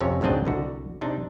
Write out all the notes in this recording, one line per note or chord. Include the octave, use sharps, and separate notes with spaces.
F2 C3 C#4 C#5
C#2 G#2 F#3 C4 D4 D#5
C2 D3 F#4
C3 D4 D#4